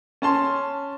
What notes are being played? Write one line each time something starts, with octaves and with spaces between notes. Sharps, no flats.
C#4 A5 C6